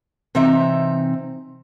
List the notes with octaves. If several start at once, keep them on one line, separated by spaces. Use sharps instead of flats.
C3 E3 C4 D#4 E5